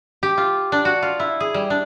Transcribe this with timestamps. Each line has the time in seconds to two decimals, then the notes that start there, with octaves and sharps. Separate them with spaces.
0.23 G4
0.38 F4
0.72 D4
0.85 F#4
1.03 F4
1.20 E4
1.40 G#4
1.54 G3
1.70 D4